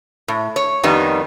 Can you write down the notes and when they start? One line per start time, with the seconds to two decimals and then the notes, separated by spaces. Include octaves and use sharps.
0.28 A2
0.56 C#5
0.84 F2 D#3 G3 B3 D#4